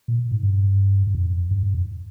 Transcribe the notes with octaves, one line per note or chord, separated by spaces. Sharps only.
A#2
G#2
G2
G2
F2
G2
G2
F2